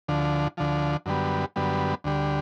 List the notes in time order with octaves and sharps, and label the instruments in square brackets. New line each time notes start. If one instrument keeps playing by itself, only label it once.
[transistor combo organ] D2 D3 F3
D2 D3 F3
F#2 D3 G3 B3
F#2 D3 G3 B3
D2 D3 G3